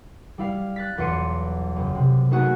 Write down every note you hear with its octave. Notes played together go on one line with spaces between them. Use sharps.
G3 E4 F5
F#6 A6 B6
B1 E2 F4 C6 C#7 D#7
F#1
C3
A3 A#3 D#4 F#4 G#4